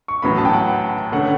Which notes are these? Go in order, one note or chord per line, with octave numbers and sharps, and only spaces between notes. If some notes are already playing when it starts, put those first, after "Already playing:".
C#6
A1 A2 F#3 B3 B5
A5
G5
F#5
D3 A3 C#4 F#5